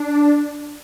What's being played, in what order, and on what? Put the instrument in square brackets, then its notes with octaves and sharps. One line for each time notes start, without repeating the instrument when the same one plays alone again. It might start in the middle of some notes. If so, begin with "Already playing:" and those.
Already playing: [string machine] D4